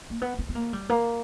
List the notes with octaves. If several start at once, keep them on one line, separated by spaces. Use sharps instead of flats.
A#3
B3
B3
B3
A#3
G3
A#3